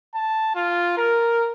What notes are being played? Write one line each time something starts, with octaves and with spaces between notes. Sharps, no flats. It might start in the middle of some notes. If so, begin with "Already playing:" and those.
A5
F4
A#4